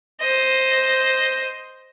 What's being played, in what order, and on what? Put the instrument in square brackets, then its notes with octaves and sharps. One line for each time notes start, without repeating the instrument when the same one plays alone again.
[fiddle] C5 D#5